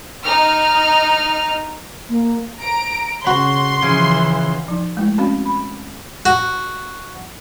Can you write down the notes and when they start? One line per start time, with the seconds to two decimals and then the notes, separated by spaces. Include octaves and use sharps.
0.24 D#4 F6
2.09 A#3
2.60 A#5 D7
3.27 C#3 F#4 C6
3.82 C#3 E3 F3
4.68 F3 D#4
4.97 G#3 A3 E4
5.18 C4 C#4 F#4 F5
5.45 B5
6.26 F#4